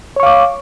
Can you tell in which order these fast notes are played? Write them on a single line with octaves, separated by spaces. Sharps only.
C#5 C#6 F5 D6